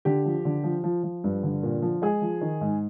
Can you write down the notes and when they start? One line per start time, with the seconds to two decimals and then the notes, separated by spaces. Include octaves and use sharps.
0.05 D3 G4
0.25 F3
0.45 D3
0.64 F3
0.84 F3
1.04 F3
1.24 G2
1.43 D3
1.63 A#2
1.82 F3
2.02 G#3 G#4
2.22 F3
2.41 D#3
2.61 G#2